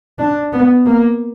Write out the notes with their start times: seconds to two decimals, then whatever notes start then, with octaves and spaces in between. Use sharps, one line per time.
0.19 D4
0.53 B3
0.86 A#3